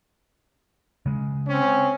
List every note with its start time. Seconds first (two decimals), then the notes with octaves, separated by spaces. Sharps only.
1.06 C#3 G#3
1.48 C4 C#4